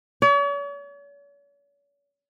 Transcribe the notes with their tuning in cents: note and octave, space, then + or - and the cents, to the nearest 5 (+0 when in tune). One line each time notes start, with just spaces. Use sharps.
C#5 +45